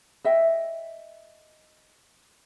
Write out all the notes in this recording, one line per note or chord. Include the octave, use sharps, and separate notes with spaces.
D#5 E5 G5